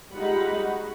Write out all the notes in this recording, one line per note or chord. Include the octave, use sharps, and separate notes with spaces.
G3 G#3 D#4 F4 F#5 B5
F#4